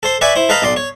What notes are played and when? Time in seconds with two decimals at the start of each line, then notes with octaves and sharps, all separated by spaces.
0.03 A4 C5 C6
0.21 B4 D5 E5 G#5 B5 C#6
0.36 E4 C5
0.49 A4 B4 D#5 F5 A#5 B5
0.62 B1 D5 C6
0.76 C#5